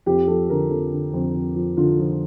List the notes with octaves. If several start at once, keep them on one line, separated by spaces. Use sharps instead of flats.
F2 G4
F3 A4
D3 A#4
F2 A4
D3
F2
F2
F3
D3 F4
F3